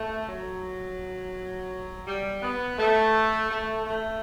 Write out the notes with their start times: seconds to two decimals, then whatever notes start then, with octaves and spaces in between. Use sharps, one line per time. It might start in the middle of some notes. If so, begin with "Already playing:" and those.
Already playing: A3
0.27 F#3
2.06 G3
2.42 B3
2.78 A3
3.50 A3
3.85 A3